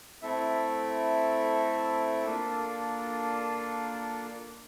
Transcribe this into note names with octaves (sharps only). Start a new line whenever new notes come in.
A3 C4 E4 A4 E5
A#3 D4 F4 A4